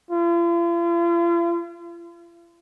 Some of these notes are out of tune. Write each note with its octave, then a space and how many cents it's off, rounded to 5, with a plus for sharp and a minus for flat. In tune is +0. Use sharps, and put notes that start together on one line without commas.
F4 -45